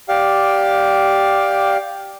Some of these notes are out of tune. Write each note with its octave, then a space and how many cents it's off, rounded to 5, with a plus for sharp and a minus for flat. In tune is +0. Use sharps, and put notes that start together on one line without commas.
G4 +0 D5 +0 F5 +15